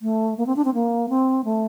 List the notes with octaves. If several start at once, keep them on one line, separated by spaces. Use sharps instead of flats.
A3
A#3
C4
D4
C4
A#3
C4
A3